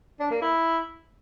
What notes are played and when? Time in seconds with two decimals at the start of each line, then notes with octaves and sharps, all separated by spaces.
0.20 D4
0.31 A#3
0.42 E4